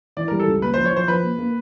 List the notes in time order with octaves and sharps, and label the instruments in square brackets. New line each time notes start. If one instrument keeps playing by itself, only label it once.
[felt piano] E3 [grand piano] D5
[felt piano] G3 [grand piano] A#4
[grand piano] A4
[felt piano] C#2
[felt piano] A#3 [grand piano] B4
[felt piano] F3 [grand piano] C5
[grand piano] C#5
[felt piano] F3 [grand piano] C5
[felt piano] F3 [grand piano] B4
[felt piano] A#3
A#3